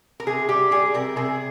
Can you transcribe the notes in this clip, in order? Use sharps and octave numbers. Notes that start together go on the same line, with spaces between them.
A#4
C3 G#4
G3 G4
G3 G#4
C3 A#4
C3 G#4